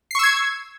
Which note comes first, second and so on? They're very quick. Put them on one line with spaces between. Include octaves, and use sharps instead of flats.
C7 C#6 E6 G#6